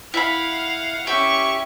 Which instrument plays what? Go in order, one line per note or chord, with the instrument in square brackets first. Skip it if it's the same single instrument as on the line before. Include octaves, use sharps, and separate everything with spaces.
[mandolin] E4 B5 [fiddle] F5 F#5
[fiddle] C#4 E4 [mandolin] G4 [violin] C#6